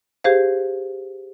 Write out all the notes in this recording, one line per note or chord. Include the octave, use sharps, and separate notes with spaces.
G4 G#4 C5 F5